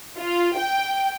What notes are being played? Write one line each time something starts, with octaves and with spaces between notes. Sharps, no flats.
F4
G5